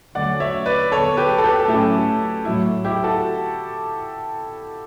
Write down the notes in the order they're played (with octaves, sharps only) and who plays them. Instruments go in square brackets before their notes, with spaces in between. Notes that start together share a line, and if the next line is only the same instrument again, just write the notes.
[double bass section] D3 F#3 A3 C#4 [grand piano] D5 F#5
[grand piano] C#5 E5
B4 D5
[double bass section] D3 F#3 B3 [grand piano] A4 C#5
[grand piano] G4 B4
A4
G4 B4
A4
[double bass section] A2 F#3 A3 C#4 [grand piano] E4 G4
[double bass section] A2 F#3 A3 [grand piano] E4
[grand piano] E4 G4
F#4 A4